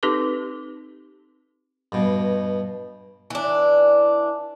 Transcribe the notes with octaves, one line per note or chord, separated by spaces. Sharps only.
C4 D#4 G4 A4 B4 D6
G2 B2
E3 D4